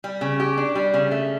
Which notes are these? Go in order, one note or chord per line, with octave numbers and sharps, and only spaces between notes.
G3
C#3
G4
D4
G3
C#3
A3